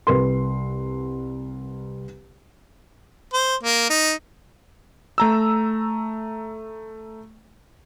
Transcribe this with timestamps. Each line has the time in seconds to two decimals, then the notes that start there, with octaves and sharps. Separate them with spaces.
0.07 C2 B4 C6
3.33 C5
3.63 A#3
3.90 D#4
5.18 A3 A#5 E6